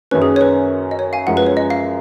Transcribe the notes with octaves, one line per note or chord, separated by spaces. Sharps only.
F#2 D#3 A#3 C#4 B4
G#4
C#5
B4
D#5
C#5
F5 G#5
F#2 F3 G#3 C#4 F#5
B4
C#5
D#5
F5